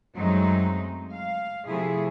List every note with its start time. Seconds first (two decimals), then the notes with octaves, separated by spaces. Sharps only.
0.15 F#2 F#3 G#3 A3 C4 D#4
1.12 F5
1.67 C3 F3 A3 E4 G#4